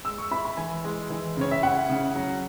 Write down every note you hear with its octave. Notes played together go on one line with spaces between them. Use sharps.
G#3 E6
C#6
E4 B5
B5
E3 G#5
G#3
E3
C#3 C#5
E5
E4 F#5
C#3
F#3